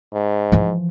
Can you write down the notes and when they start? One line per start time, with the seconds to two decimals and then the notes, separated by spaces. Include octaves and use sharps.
0.14 G#2
0.52 E3 F3